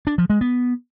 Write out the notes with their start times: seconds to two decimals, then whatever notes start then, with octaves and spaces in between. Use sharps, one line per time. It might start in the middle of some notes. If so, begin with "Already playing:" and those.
0.07 D4
0.18 F3
0.30 G#3
0.41 B3